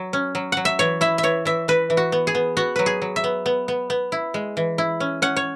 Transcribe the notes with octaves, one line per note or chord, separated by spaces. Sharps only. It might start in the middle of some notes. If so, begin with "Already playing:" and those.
Already playing: F#3
C#4
F#3
F#3 F#5
E5
E3 C#5
E4 E5
E5
E3 C#5
E3 E5
E3 B4
E3
F#4
B3
G#4
B3
B3 F#4
F#3 B4
G#4
F#3
E5
B3
B3
B3
B3
E4
G#3
E3
E4
C#4
C#4 F#5
C#5